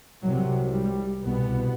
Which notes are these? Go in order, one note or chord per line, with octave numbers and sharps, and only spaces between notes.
C2 C3 F#3
G3
C2 B2 B3